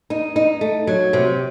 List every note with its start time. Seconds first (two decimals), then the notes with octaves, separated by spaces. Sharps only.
0.10 D#4
0.36 D#4
0.61 A3
0.87 F#3
1.13 C3